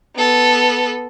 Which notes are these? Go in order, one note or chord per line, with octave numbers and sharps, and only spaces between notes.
B3 A4